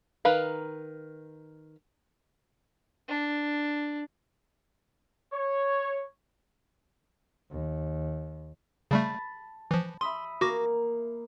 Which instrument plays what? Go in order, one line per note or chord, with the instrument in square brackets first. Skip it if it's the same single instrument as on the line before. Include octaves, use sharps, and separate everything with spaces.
[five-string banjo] D#3 A#4 B4 F5
[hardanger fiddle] D4
[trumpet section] C#5
[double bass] D#2
[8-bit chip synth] C#3 G3 A3 [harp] A5 B5
[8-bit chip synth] E3 F3
[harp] E5 B5 D#6 [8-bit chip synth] C6
[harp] A#3 [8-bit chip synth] F#4 D6 A#6